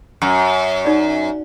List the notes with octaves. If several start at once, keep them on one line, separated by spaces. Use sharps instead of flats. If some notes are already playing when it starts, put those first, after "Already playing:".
F#2
D#4 D5